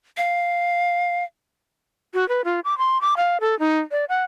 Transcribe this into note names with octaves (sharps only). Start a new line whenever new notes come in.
F5
F#4
B4
F4
D6
C6
D6
F5
A4
D#4
D5
F#5